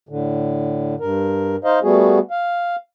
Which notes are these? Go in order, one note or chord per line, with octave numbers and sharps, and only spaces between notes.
A2 D3
G2 A#4
D#4 C5 D#5 F5
G3 A3 B3 F#4 G#4
F5